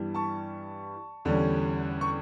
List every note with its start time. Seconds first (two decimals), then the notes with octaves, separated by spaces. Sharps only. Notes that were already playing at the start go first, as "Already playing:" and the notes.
Already playing: G2 E3 G3 B3
0.14 A5 C#6
1.25 E2 D3 G3 C#4
2.01 C#6